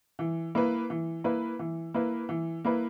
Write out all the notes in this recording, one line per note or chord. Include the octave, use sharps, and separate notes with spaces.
E3
A#3 E4 B4
E3
A#3 E4 B4
E3
A#3 E4 B4
E3
A#3 E4 B4